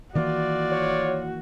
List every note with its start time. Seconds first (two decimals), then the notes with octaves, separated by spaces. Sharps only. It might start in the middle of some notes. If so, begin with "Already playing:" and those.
0.15 D#3 E3 A#3 F4 F#4 D5
0.72 C#5